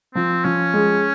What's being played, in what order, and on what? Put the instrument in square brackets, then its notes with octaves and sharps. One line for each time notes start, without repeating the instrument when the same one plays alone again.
[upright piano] F3 [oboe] C4
[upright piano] F3 [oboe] C#4
[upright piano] G#3